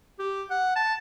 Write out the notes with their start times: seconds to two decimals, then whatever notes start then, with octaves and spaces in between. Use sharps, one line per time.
0.19 G4
0.50 F#5
0.75 A5